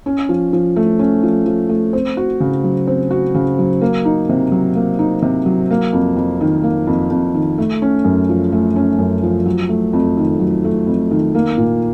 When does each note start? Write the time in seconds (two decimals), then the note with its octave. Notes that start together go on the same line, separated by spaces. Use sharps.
0.06 C#4
0.29 F3
0.53 F3
0.76 A3
0.99 C#4
1.23 F3
1.46 F3
1.69 A3
1.93 C4
2.17 F#4
2.40 C#3
2.64 F#3
2.87 C4
3.11 F#4
3.34 C#3
3.59 F#3
3.81 A#3
4.05 D#4
4.29 C3
4.52 F#3
4.75 A#3
4.99 D#4
5.22 C3
5.46 F#3
5.70 A#3
5.93 F2
6.17 F2
6.41 D#3
6.63 A#3
6.87 F2
7.10 F2
7.34 D#3
7.58 A3
7.82 C#4
8.04 F#2
8.29 F3
8.52 A3
8.76 C#4
8.99 F#2
9.23 F3
9.46 F#3
9.69 A3
9.93 F2
10.17 D#3
10.40 F#3
10.64 A3
10.87 F2
11.11 D#3
11.35 A#3
11.58 A#2